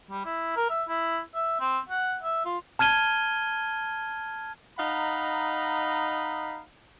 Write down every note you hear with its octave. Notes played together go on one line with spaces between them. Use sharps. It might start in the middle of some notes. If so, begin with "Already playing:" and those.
G3
E4
A#4
E5
E4
E5
C4
F#5
E5
F4
A5 F6 G#6 D#7 G7
D#4 D#5 F5 F#5 A#5 B5